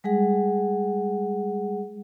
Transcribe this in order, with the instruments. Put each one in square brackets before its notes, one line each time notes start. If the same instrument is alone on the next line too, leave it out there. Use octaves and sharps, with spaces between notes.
[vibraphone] G3 G#3 G#4 F#5